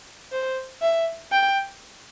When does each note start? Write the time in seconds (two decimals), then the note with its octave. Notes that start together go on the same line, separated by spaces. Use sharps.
0.32 C5
0.82 E5
1.33 G5